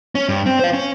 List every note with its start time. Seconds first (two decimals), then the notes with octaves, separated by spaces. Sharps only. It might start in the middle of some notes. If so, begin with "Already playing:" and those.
0.15 C#4
0.29 G2
0.46 C4
0.59 C5 F5
0.73 C#4